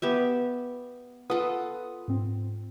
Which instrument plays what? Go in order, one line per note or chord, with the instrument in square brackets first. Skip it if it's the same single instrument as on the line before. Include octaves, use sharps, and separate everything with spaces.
[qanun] B3 G4 E5
[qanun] F4 A4 [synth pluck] B4 F#5 D#6
[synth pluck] G#2 C4